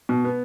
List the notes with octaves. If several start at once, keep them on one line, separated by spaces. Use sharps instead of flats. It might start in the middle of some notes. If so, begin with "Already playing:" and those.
B2
B3